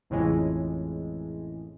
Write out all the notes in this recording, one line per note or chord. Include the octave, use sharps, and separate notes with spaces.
A1 F2 A2 C#3 E3 G#3